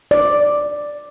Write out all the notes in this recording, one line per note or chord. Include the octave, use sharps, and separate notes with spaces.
D5